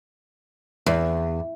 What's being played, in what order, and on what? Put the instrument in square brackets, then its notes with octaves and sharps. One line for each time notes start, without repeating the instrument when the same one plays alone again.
[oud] E2